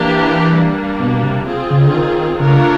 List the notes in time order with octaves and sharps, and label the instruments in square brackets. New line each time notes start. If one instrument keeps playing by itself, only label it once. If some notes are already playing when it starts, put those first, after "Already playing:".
Already playing: [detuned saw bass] E3 [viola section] A#3 D4 G4
[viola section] G3 A#3 D4
[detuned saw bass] B2
C3
[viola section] C4 F4 G#4
[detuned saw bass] C#3
D3
D#3
[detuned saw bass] C#3 [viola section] A3 D4 F4 A#4 C#5